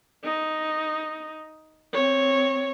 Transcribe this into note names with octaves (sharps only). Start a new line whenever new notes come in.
D#4
C4 C#5